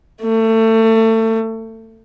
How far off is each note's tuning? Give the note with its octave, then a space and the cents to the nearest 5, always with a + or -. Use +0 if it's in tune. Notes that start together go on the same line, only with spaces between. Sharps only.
A3 +25